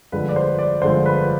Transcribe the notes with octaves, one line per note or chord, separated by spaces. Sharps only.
G1 F2 D3 G#3 B4
D5
C5
D5
G1 F2 D3 G#3 C5
B4